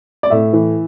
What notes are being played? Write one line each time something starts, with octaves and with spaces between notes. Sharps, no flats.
D5
A2 E5
E3